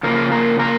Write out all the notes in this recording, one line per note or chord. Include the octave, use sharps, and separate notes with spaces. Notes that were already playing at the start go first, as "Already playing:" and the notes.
C#3 F3 A#3 A#4
A#3 A#4
A#3 A#4